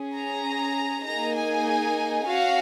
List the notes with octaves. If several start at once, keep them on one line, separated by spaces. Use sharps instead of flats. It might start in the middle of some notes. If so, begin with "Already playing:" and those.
Already playing: C#4 G#4
A#5
A#3 D#4 G#4 A#5
G#5
C#4 F#4 F5